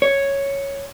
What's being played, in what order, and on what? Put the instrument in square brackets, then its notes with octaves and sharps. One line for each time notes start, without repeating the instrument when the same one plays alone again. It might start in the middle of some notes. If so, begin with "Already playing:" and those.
[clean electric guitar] C#5